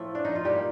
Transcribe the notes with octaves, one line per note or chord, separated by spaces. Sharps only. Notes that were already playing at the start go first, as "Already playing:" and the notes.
Already playing: A2 F3 A3
D4
D#4
F4
A#2 G3 A#3 G4